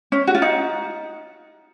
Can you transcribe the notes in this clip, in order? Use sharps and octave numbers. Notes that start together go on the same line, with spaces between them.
C#4
F#4
F4
D#4